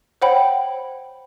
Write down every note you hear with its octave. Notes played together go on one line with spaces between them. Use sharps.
C5 C#5 F#5 G5 B5